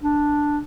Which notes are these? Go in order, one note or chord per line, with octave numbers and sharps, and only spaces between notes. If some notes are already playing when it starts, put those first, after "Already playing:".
D4